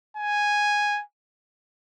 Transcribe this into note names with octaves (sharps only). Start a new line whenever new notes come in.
G#5